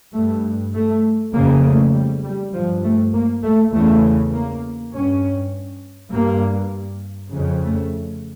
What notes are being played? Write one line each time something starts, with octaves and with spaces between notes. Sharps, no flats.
G2 A3
A3
F2 C#3 A#3
A3
G3
G3
G2 F3
A3
A#3
A3
E2 C#3 A3
A#3
G2 C#4
G2 A#3
F2 C#3
A3